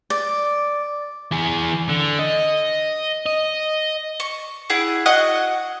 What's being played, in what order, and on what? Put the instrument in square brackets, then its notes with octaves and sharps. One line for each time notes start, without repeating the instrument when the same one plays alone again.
[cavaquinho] D5
[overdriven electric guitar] E3 G#4
D3
D#5
D#5
[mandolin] C#6
E4 G#4 F#5
F#4 D#5 F#5